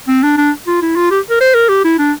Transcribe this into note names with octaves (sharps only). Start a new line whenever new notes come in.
C4
D4
D4
F4
E4
F4
G4
A#4
C5
A#4
G4
E4
D4